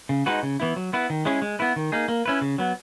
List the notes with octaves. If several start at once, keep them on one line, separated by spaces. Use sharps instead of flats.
C#3
G#3 D#4 F#4 B4
C#3
E3 B3 E4
F#3
B3 E4 B4
D#3
G#3 C#4 E4 G#4
G#3
B3 E4 B4
D#3
A#3 D#4 G#4
A#3
C#4 E4 B4
C#3
F#3 B3